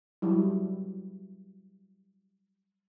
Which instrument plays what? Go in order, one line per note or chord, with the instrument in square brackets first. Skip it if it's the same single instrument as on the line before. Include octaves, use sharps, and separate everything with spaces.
[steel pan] F#3 G3 E4